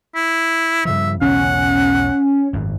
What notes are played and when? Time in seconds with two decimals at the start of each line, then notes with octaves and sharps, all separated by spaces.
0.15 E4
0.85 G2 C#3 F3 E5
1.21 B1 E2 C#3 C#4 F#5
2.53 G#1 F#2